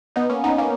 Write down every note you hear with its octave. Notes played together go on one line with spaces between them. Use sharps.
B3 D#4
A#3 C#4
B3 D#4
A#3 C#4